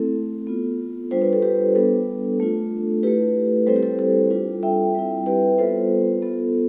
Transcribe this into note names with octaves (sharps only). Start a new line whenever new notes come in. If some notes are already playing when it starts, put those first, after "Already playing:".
Already playing: A3 C4 E4 A4
B3 F4
G3 D4 F4 C5
B4
A4
G4 B4
G3 B3 D4 A4
A3 D4 F4
A3 E4 G4 B4
G3 C4 E4 A4 C5
G4
A4
A4
G3 D4 F4
E5 G5
G3 C4 E4
G4 B4
G3 B3 F4 A4 C5
B3 F4 A4